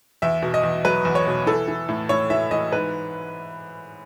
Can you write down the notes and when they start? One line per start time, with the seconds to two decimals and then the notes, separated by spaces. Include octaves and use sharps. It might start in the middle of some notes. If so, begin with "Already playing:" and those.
0.22 E2 E5
0.42 B2
0.54 D#5
0.63 E2
0.84 F#3 B4
1.05 E2
1.15 C#5
1.26 B2
1.47 E3 A4
1.68 E3
1.89 A2
2.09 A2 C#5
2.30 E3 E5
2.51 E3 D#5
2.72 G#2 B4